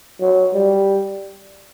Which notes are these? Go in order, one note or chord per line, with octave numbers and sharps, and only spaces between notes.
F#3
G3